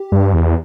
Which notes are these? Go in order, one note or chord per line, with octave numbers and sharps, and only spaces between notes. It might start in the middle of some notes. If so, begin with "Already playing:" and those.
Already playing: G4
G2
E2